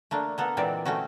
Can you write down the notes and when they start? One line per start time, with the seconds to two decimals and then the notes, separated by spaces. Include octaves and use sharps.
0.11 A3 A#3 D4
0.38 A#3 B3 A4
0.57 A#2 E3 G#3 C4 D5
0.85 A3 C4 C#4 F#4